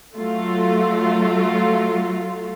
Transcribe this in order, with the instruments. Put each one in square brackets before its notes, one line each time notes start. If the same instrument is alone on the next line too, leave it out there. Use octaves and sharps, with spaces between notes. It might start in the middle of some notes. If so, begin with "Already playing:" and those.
[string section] F#3 A3 F4